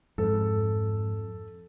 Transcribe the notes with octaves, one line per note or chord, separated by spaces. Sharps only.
F2 G#2 A4